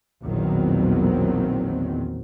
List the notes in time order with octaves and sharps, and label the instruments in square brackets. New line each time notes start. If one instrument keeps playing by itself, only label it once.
[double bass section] A#1 E2 B2 D#3 F#3 C4